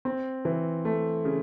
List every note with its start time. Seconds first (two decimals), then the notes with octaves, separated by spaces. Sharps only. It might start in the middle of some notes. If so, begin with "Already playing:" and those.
0.05 C4
0.45 E3
0.85 A3
1.25 C#3